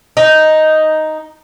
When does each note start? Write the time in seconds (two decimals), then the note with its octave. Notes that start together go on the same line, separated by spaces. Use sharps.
0.17 D#4